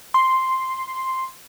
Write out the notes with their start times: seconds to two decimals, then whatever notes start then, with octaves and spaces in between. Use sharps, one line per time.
0.14 C6